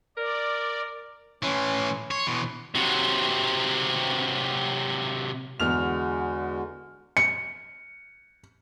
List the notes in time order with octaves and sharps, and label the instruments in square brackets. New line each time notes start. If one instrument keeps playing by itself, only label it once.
[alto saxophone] A#4 [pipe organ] D5
[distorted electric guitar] A2 E3 [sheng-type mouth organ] C#4 C6
[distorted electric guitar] C#5 [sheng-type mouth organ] C6 C#6
[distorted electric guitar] B2 E3
C3 F#3
[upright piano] E2 F6 F7 [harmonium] D3 G#3 F#4
[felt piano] C#7